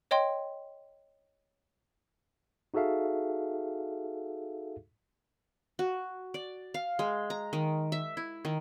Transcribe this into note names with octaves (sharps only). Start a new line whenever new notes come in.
C#5 D#5 G5 C6
D#4 F#4 G#4 A4 E5 F5
F#4
D5
F5
G#3
A#5
D#3
E5
E4
D#3